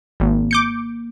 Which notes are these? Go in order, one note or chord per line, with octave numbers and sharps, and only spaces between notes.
G#1 A#3
D6 G6 C#7